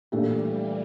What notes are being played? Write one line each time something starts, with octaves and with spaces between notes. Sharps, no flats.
A#2 E3 G3 A3 D4 G4